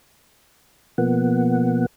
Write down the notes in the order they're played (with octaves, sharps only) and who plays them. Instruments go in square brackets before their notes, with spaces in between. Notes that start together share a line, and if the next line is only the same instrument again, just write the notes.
[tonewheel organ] B2 F3 A#3 B3 F#5